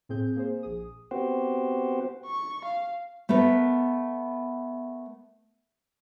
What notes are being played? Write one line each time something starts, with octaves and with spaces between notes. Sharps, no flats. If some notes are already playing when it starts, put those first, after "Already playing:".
A2 C4 G#4 G6
A#3 G#4 C5
A#1 G#4 D#6
B3 C4 F#4 G4 C5
C#6
F5
A3 B3 A#4 B4